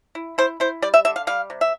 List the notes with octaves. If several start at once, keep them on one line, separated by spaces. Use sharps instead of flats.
E4
E4 C5
E4 C5
G3 D5
E5
D3 E5
F5
G3 F5
C3
E5